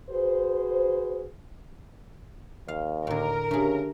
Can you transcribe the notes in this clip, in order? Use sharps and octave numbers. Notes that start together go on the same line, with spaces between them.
F#4 G#4 B4 C5
D#2 F5
A2 D3 A#4
C#3 A3 D4 G4 G#4